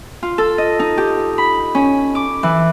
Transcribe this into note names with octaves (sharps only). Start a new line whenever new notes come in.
F4
A4
D#5
D#4
G4
B5
C#4
D6
E3